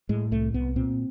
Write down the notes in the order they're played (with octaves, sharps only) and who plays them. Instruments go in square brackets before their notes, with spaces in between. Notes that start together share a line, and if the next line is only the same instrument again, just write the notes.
[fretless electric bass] A2 G#3
C2 A3
C2 B3
A#2 C4